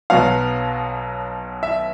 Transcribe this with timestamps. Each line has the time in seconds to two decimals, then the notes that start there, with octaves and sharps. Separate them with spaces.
0.10 B1 B2 F#3 B3 F5
1.63 E5